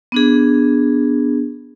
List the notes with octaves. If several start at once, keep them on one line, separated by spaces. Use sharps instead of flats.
B3 D4 G#4